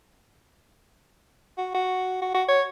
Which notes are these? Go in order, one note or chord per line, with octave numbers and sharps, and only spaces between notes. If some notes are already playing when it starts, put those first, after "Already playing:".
F#4
F#4
F#4
F#4
C#5